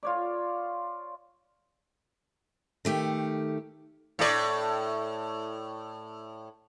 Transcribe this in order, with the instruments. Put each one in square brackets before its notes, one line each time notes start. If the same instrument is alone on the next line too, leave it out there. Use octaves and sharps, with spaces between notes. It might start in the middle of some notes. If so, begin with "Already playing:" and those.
[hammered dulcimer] F4 C#5 D5
[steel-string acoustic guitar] D#3 A3 G4
[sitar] A2 D5